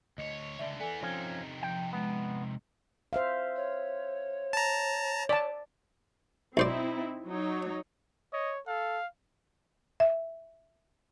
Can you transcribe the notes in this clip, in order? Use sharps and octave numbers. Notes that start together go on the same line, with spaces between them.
D2 C#5 D#5
C#2 D3 D5 E5
E3 B3 A4 D5 G#5
C3 F3 C#4 D#4
F3 G5
G#3 B3
C5 E5 F5
C#5
A5 A#5
D5 A5
B1 C4 D#4 E4 C5 D5
F#3 D#4 C#5
C#5 D#5
A4 F5
E5